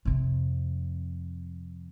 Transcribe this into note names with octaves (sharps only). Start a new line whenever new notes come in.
F2 C3